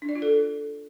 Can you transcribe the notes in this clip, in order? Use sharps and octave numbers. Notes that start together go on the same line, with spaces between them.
D4
D5
F4
A4